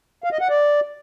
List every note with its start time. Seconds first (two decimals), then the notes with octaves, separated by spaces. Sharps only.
0.24 F5
0.32 D#5
0.41 F#5
0.49 D5